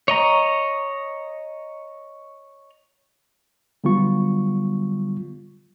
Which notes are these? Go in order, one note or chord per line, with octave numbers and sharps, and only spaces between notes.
C#5 D#5 A#5
D3 F#3 G3 B3 F4 C#6